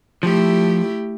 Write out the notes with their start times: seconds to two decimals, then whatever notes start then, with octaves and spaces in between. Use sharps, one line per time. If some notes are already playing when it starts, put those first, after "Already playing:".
0.23 F3 A3 E4 G4